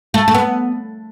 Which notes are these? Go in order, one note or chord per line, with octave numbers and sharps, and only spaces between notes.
A3
A3
B3